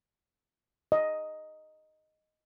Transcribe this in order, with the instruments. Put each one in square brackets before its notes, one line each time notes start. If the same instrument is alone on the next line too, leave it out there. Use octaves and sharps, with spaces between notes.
[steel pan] D#5